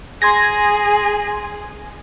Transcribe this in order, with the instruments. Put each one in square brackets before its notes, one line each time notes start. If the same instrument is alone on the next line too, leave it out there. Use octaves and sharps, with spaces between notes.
[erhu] G#4 [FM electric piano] C6 G#6 A#6